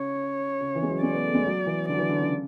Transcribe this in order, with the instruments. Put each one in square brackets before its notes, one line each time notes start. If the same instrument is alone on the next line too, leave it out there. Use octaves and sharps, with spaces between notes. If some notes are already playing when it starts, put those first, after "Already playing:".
Already playing: [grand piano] C#3 [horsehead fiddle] C#5
[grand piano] C#3
E3
G#3
F#3
[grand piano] G#3 [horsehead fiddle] D5
[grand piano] B3
A3
G#3
F#3
E3
[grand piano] D3 [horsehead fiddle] D5
[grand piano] F#3
E3
D3
C#3